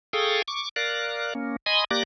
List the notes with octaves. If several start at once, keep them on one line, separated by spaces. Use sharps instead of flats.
G#4 A4 F5 G5 C#6 D#6
C#6 D6
A#4 D5 F5 F#6
A#3 C#4
D#5 G#5 B5 C6 D#6
A#3 G4 D5 D6 F#6 A#6